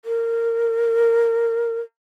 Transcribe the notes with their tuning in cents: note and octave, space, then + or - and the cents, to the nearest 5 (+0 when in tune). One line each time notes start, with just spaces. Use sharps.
A#4 -15